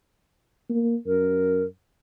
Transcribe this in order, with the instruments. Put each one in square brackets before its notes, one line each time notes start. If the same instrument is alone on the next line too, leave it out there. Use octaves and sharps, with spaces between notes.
[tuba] A#3
[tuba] F#2 [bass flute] A#4